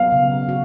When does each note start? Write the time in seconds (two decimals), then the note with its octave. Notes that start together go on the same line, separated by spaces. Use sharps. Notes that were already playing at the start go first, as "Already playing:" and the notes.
Already playing: F#3 B3 F5
0.12 C#3
0.49 F#4